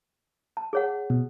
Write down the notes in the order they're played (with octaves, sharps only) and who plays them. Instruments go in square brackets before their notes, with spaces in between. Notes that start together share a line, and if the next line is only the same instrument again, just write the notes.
[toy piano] A5
G#4 C#5 F#5
[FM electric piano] B2